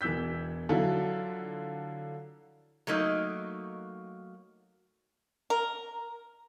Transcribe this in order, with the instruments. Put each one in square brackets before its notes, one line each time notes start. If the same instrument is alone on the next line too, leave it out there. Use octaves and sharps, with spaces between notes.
[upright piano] E1 E3 E6 G6 B6
D3 F3 F#3 E4 F4 A4
[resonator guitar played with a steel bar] F#3 A3 A#3 D#4
[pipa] A#4